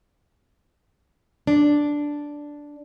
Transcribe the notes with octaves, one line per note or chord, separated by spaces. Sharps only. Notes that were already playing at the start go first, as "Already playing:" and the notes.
D4